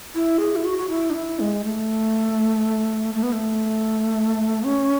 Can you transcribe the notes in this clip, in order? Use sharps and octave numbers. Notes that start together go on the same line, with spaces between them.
E4
G#4
E4
F#4
F#4
E4
D4
E4
G#3
A3
A3
B3
A3
C#4